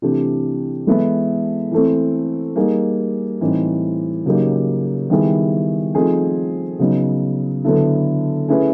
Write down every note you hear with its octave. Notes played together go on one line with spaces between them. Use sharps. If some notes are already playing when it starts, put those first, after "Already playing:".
C3 E3 A3 D4 G4
E3 G#3 B3 E4 A4
E3 A3 C4
G3 A#3 D#4 G#4
A2 E3 G3 C4 D#4
C#3 F#3 A#3 D#4 G4
D#3 G3 B3 E4 G#4
F3 A3 C4 D#4 G#4
C#3 F#3 B3 D#4
D3 F#3 B3 E4 A4
A3 C#4 E4 G#4 B4